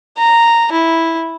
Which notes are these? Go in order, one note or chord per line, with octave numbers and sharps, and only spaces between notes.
A#5
E4